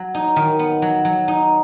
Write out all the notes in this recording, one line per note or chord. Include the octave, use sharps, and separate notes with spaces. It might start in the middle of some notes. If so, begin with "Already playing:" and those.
Already playing: F#3
D#4
D#3
B3
F#3
F#3
D#4